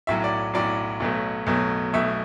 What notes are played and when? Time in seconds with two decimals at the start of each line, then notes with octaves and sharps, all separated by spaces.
0.07 B1 A2 F#3 E5
0.24 D5
0.54 B1 A2 F#3 D5
1.00 B1 B2 F#3 A3
1.47 B1 B2 F#3 A3
1.93 B1 B2 A3 E5